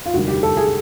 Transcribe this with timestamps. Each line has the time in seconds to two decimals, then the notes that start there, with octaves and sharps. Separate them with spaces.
0.06 F4
0.14 F1 D#2 D3 G3 F#4
0.28 G4
0.43 A4
0.57 G#4